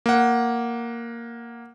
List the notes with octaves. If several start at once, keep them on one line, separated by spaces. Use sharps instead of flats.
A#3 F#5